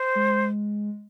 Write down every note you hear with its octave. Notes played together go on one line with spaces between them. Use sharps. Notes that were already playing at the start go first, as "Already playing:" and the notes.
Already playing: C5
G#3